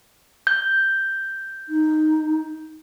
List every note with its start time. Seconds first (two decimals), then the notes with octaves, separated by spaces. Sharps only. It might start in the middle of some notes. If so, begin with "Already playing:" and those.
0.47 G6
1.69 D#4